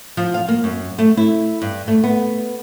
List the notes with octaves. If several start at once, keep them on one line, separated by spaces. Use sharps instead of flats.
F3
F5
A#3
F#2
A3
E4
G2
A3
B3